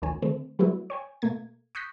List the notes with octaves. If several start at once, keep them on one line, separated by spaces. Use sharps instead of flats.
A1 D2 B2 D#3 C#5 G#5
D3 D#3 A3 C4
F#3 G3 A3 B3 E4 F#4
C#5 G5 G#5
B2 A3 A#3 G#6
C#6 D#6 F#6 G6 A#6 B6